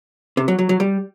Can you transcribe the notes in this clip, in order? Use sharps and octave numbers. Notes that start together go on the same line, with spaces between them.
C3
F#3
F#3
F#3
G3